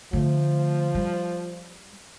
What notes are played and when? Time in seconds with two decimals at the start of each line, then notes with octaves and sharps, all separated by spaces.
0.13 D3 F3 A3
0.95 G3